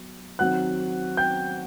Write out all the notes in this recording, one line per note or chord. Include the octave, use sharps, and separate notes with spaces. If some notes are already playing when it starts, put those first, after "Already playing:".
Already playing: F#3 B3
D#3 F#3 C4 F#5 F#6
G5 G6